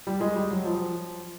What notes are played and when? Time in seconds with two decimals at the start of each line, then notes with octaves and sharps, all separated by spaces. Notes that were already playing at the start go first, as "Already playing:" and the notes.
0.07 G3
0.21 G#3
0.36 G3
0.51 F#3
0.65 F3